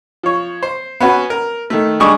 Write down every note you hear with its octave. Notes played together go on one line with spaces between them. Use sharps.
F3 C#5
C5
B3 C#4 F#4 B4
A#4
D#3 A3
G3 G#3 D4 C#6 D#6